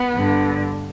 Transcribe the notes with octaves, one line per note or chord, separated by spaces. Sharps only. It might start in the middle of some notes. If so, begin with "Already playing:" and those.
Already playing: B3
G2 D3